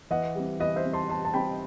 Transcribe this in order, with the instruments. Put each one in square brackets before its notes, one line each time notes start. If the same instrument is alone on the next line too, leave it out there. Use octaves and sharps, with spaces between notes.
[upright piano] E3 D#5 F#5
G3 C4
E3 B4 D#5
C5 E5
G3 C4
A5 C6
E3 A5 C6
A5
G3 C4 G5 B5